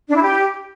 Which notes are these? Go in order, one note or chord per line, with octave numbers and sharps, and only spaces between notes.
D4
E4
G4